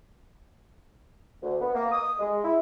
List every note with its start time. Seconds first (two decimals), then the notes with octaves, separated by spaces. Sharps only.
1.43 D2
1.61 B3
1.75 A#3
1.92 D#6
2.19 G#3
2.44 E4